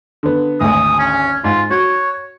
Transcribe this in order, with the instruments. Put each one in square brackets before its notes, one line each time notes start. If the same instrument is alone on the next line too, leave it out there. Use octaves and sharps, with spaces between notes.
[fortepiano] D3 B3
[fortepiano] G#1 D2 [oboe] D#6
[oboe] C#4
[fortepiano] G#2 [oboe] F4
[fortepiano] F#4 [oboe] C#5